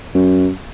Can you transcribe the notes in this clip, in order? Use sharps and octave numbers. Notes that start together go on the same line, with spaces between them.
F#2